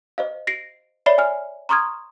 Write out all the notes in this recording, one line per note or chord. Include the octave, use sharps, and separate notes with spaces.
C5 D#5 F5
A#6 C7 D7
C#5 D5 E5 B5 C7 G7
G#5 F6
A#5 C6 C#6 D#6 F6 G#6